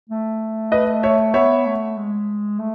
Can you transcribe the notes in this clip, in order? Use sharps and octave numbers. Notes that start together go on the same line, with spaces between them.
A3
B4 D#5
C#5 E5
B3 C#5 E5
A3
G#3
A3